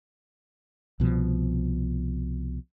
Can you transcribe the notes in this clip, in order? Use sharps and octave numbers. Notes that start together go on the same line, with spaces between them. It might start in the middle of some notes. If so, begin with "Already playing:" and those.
C2 B2 D#3 F3